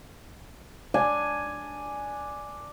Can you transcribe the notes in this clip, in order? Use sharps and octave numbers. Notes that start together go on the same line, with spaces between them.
D4 G#5